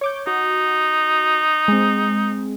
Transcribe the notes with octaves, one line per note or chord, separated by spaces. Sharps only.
C#5 D6 G6
D#4 F#4
G#3 C4